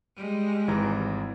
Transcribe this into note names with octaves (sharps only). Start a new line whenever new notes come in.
G3 G#3
G#1 E3 A#5